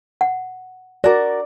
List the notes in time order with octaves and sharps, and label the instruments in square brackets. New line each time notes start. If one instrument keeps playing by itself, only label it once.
[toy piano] F#5
[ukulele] F#4 A#4 [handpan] D5